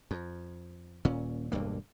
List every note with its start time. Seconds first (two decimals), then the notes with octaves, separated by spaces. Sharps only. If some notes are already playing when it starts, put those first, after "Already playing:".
0.11 F2
1.05 D#1 A#2 C#4
1.52 E1 D2 G2 A#3